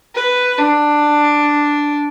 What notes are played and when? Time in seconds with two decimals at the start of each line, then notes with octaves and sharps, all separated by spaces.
0.15 B4
0.58 D4